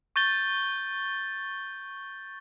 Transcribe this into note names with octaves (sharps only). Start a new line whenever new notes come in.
C#6 G6 A6 G7